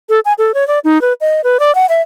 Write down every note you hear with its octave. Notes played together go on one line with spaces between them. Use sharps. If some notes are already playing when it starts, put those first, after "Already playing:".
A4
G#5
A4
C#5
D5
D#4
B4
D#5
B4
D5
F#5
E5